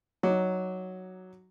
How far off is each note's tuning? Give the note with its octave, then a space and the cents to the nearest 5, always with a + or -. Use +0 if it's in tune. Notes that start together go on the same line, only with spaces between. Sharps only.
F#3 +0 D#4 +0 D6 +0